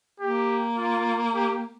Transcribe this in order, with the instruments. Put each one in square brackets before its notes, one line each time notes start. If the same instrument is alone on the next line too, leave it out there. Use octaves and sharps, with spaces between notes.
[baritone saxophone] A#3 [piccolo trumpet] G4
[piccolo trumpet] F4
G4